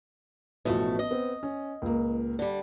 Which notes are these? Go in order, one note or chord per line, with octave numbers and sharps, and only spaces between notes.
A1 B2 F3 A3 E4
D#5
B3 C4
C#4
C#2 A#2 A#3
D3 G3